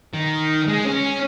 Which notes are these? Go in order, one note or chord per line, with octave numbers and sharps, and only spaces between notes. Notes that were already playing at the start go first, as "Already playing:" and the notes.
D#3
G#3
C#4